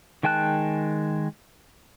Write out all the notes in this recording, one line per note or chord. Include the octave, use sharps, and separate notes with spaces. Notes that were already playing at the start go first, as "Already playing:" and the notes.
D#3 G#3 G5 A5 F#6